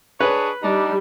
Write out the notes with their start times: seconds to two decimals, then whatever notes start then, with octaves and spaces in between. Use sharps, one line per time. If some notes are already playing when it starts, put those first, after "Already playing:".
0.21 D4 G#4 B4 C#5
0.63 G3 D4 D#4